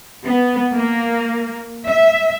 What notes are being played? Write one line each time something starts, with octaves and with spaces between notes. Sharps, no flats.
B3
A#3
E5